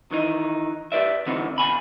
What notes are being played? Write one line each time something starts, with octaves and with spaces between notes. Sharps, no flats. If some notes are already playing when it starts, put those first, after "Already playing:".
D#3 E3 D#4
G4 B4 D5 E5
D3 E3 B3 C4 D#4
B2 G#5 B5